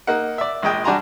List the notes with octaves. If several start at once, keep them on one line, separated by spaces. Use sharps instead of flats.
A#3 D#4 F#5
D5 E5
A#1 G#3 D#5 G5
G3 D4 F#4 G#5 A#5 C6